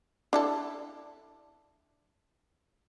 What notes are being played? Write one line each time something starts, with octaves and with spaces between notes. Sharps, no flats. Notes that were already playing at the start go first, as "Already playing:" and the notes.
D4 E4 A4